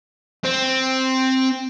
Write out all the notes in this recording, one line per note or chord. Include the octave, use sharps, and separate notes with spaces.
C4